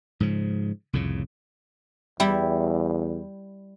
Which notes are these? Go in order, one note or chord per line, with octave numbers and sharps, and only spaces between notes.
G#2 C#3 F3
C2 F2 A2 C#3
E2 G3 E4